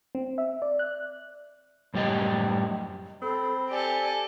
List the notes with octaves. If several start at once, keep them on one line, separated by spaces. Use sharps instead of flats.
C4
E5
D5
F#6
F#2 A2 G3 G4 D#5
C4 A4 B5
G4 A4 D5 G#5